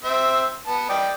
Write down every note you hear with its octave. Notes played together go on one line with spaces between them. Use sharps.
C4 E5
B3 A5
D5 D#5 G5